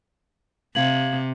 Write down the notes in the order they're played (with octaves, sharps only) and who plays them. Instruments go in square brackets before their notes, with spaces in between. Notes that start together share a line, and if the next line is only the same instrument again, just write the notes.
[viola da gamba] C3 [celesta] F5 G#6 F#7